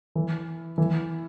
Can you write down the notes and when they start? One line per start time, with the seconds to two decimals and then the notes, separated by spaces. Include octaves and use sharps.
0.15 E3
0.78 E3